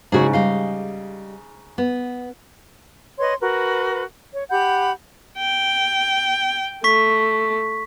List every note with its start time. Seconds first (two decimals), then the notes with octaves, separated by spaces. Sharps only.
0.12 G#2 C#3 F#4 G#4
0.33 G3 D#5 F5
1.78 B3
3.19 B4 C#5 D#5 C6
3.41 F#4 A#4 B4
4.33 C#5
4.50 G4 F#5 B5 G6
5.38 G5
6.84 A3 C#6 B6